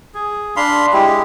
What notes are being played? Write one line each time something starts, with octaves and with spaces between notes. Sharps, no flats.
G#4
D4 F5 B5 C6
G#3 E4 G4